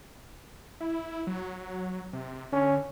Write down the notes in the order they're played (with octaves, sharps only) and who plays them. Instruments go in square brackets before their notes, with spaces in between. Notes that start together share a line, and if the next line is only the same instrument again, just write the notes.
[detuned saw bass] E4
F#3
C3
[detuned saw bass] D3 [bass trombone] C#4